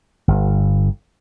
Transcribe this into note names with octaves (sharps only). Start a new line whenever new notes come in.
G1